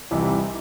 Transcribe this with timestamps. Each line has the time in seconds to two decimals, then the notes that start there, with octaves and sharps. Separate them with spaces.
0.11 C2 C3 E3 G3 D#4